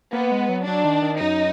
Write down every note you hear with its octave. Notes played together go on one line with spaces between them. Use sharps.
A#3 B3
G#3
F#3
F#3 D4
D#3
D#3
F#2 D#4